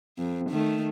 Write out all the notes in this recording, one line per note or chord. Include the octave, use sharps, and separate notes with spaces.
F2
D#3 A3